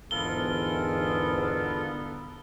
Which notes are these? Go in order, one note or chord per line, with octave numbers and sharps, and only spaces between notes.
E2 G#2 D3 B3 F4 A4 A#4 G7